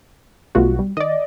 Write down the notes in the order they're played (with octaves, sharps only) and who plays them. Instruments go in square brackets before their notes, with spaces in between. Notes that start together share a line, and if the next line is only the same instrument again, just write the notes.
[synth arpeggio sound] B1 B2 F#4 [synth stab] G3 A3 F4
[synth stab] G3
[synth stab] D#3 [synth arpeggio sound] D5 D#5